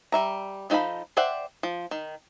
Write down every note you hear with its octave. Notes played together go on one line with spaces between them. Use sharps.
G3 E5 A#5
F3 D#4 A4 F5 B5
C5 D5 E5 F#5 G5
F3
D#3